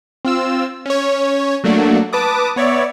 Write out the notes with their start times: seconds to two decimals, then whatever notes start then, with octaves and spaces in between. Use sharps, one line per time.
0.25 C4 F4 E6
0.86 C#4 C#5
1.64 F#3 A3 A#3 D4 F#4
2.13 B4 A5 D6 D#6
2.56 B3 C#5 D5 E5